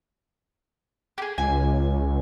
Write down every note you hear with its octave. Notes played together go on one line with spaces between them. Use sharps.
G4 G#4
C#2 G#5